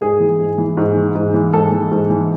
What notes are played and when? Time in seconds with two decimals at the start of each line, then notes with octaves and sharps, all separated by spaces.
0.01 G#2 G#4
0.20 E3
0.39 G#2
0.58 E3
0.77 G#2
0.96 E3
1.15 G#2
1.34 E3
1.53 G#2 A4
1.72 E3
1.91 G#2
2.10 E3